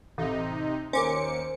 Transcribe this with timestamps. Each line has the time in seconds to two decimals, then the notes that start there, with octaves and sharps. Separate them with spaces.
0.18 A1 C3 D#4
0.93 D#2 C#4 A#4 C5 D6 C#7